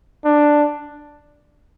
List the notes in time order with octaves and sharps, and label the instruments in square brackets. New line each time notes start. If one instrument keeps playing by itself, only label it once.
[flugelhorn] D4